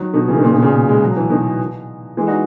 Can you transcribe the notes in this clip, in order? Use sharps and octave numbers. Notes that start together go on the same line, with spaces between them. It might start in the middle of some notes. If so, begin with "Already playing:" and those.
Already playing: D#3 F#3
B2 D#3
C#3 E3
D#3
A#2 C#3
B2 D#3
A#2 C#3
B2
G#3
F#3
E3
B2 D#3
E3 G#3
D#4 F#4